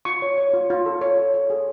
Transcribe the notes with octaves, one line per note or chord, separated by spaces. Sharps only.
F4 C#6
C#5
C#5
F4
F4
A4
C#5
A4
C#5
G#4